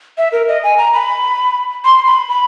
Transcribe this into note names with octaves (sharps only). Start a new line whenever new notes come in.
E5
A#4
D#5
G#5
A#5
B5
C6
B5
B5